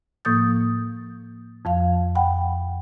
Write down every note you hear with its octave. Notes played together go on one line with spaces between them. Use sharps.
A2 F3 A#3 D#6 G6 A6
F2 F3 F5
F#5 G5 B5